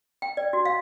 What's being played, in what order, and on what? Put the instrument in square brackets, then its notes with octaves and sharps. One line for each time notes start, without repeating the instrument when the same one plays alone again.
[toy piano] G5
D5
F#4
F5